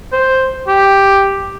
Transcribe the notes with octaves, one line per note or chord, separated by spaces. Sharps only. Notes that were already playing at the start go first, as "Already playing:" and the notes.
C5
G4